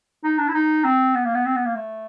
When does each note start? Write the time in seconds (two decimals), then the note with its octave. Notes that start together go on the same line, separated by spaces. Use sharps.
0.24 D#4
0.38 D4
0.49 E4
0.54 D#4
0.84 C4
1.14 B3
1.25 A#3
1.35 B3
1.45 C4
1.56 B3
1.65 A#3
1.75 A3